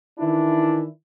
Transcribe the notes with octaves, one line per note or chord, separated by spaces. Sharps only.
D#3 E3 D4 E4